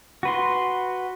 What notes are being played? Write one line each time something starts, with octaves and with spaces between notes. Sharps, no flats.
F#4 B4 C6